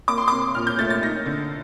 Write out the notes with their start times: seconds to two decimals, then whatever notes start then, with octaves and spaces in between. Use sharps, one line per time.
0.08 A#3 D6
0.18 C6
0.28 C3 D6
0.55 A#2 F6
0.67 G6
0.79 A3 A6
0.90 A6
1.02 D#4 A#6
1.26 D3